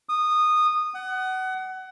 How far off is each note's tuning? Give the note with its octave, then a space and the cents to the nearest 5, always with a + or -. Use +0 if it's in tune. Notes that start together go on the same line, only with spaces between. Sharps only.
D#6 -15
F#5 +25